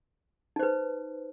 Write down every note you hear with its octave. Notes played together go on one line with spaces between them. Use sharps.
D#4 B4 C5